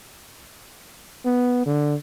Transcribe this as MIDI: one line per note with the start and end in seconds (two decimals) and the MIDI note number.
1.25 1.64 59
1.66 1.95 50